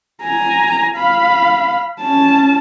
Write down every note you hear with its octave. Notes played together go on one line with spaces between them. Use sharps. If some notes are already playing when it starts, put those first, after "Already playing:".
G#5 A#5
F5 B5
C#4 A5